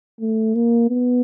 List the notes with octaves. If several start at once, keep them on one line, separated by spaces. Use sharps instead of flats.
A3
A#3
B3